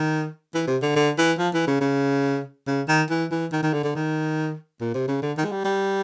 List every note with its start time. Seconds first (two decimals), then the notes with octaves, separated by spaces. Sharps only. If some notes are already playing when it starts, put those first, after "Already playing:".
Already playing: D#3
0.54 E3
0.67 C3
0.82 D3
0.96 D3
1.18 E3
1.39 F3
1.54 E3
1.68 C#3
1.81 C#3
2.67 C#3
2.88 D#3
3.10 E3
3.31 E3
3.52 D#3
3.63 D#3
3.73 D3
3.84 D3
3.95 D#3
4.81 A#2
4.94 C3
5.08 C#3
5.22 D3
5.38 D#3
5.45 G#3
5.52 G3
5.65 G3